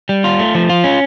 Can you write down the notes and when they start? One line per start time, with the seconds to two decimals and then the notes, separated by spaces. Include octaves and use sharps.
0.09 G3
0.24 F4
0.39 A3
0.55 F3
0.69 F4
0.84 C#4